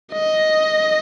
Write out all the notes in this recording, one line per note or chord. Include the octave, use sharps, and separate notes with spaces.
D#5